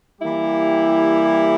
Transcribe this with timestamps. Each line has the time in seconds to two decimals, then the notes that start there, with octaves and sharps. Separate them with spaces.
0.21 E3 G3 A#3 E4 G4